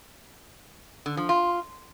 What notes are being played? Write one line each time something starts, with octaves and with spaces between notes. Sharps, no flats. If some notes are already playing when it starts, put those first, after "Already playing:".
D3
F3
F4